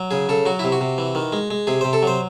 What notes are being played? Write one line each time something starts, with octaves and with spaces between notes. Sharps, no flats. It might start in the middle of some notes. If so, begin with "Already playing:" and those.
Already playing: F#3
C#3 G#4
C#3 A4
F#3 F#4
C3 E4
F#4
C3
E3
D#3
G#3
G#3
C3 G#4
C3 C5
A4
F#3 C5